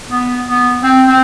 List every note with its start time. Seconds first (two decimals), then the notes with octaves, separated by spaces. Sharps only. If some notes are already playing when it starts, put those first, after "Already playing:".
0.10 B3
0.47 B3
0.83 C4
1.07 C4